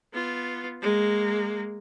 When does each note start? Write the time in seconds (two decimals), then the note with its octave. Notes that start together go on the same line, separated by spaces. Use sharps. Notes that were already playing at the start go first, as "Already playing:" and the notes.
0.13 B3 F4
0.82 G#3 A#3